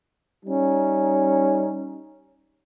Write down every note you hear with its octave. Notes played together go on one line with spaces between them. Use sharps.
G3 C#4 D#4